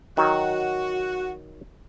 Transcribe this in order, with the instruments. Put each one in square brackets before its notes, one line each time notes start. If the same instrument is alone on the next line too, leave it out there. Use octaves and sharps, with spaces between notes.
[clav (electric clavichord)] D#3 F#3 [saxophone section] F#4